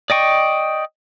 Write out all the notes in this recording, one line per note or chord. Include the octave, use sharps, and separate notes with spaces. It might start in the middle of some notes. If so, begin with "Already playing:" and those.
D5 D#5 G5 C#6